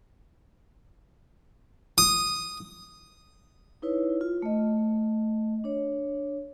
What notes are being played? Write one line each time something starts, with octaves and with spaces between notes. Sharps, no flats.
D#6
D#4 E4 B4 C#5
F4
A3 D#5
D4 C#5